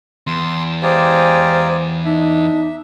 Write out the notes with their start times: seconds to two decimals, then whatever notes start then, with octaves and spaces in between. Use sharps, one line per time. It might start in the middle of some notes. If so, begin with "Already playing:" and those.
0.27 E2 C6
0.83 G#3 G4 C5 D5 F5 G#5 A#5
2.05 D4 D#4 E5